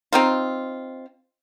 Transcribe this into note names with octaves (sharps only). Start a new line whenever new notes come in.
C4 D#4 F4